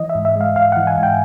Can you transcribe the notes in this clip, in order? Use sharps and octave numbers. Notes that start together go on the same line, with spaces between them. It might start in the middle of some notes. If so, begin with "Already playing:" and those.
Already playing: E3 D#5
E5
G#2
E5
G#3 F5
G#2 F5
E3 F#5
G#5
G#2
G5